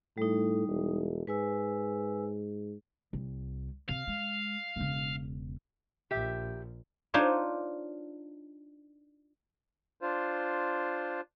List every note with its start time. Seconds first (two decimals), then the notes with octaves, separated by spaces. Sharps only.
0.18 A2 G3 D#4
0.68 E1
1.27 G#2 B4 G#5 E6
3.13 C2
3.89 C3 F5
4.07 G#3
4.76 E1 C#3
6.11 A#1 G4 E5
7.14 D4 D#4 F4 C5 C#5
10.01 D4 F4 C5